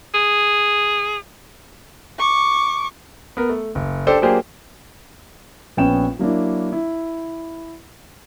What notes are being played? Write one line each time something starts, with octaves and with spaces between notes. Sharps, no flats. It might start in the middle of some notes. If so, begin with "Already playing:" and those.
G#4
C#6 D6
B3 A#4
A3
F#1
D4 G4 A4 C5
F#3 A#3 D4 G4 G#4 C5
A#1 B3 C#4 G5 E7
F#3 A#3 D4 E4
E4